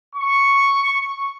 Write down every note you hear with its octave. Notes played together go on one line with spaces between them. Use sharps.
C#6